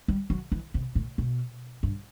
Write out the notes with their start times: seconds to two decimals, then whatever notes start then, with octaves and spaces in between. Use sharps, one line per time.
0.08 G3
0.30 F#3
0.52 E3
0.74 C3
0.95 A2
1.18 B2
1.83 G2